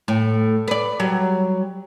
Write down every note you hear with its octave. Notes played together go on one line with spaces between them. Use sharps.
A2
B4 D5
F#3 G3